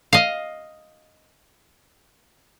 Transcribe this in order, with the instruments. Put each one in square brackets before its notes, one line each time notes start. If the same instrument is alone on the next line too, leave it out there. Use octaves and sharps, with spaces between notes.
[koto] D#5 F5